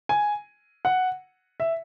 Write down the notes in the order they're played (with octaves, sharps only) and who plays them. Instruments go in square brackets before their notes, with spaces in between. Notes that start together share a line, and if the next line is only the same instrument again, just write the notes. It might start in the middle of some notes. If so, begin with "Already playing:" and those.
[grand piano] G#5
F#5
E5